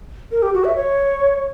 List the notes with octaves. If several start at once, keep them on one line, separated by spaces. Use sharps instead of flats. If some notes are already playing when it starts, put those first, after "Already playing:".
A#4
G4
F#4
E5
C#5